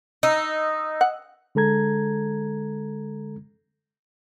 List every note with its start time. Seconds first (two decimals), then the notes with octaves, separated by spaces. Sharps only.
0.23 D#4 D#5 D#6 E6
1.01 F#5
1.55 D3 G#3 A4 A#5 G#6